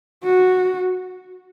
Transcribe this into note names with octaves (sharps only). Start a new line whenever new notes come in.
F#4